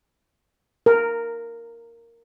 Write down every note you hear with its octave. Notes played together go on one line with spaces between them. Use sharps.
A#4